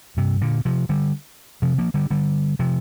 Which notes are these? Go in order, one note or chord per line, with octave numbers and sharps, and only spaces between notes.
G2 C3
A#2 D3
C3 F3
D3 G3
C3 F3
F3 A#3
D3 G3
D3 G3
C3 F3